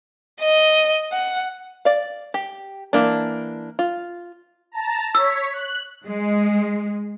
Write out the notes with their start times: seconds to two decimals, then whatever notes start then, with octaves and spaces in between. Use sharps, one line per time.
0.41 D#5
1.12 F#5
1.85 D5 F5
2.34 G4
2.93 E3 A#3 D4
3.79 F4
4.72 A5 A#5
5.15 C#5 E6 B6
5.53 F#6
6.06 G#3